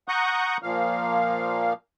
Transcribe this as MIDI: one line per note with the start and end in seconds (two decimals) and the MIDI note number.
0.08 0.57 78
0.08 0.57 82
0.08 0.57 85
0.08 0.57 87
0.08 0.57 90
0.08 0.57 91
0.63 1.73 46
0.63 1.73 53
0.63 1.73 58
0.63 1.73 77